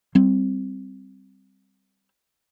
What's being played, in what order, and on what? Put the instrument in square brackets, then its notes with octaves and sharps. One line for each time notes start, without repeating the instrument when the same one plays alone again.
[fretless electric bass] G3 C4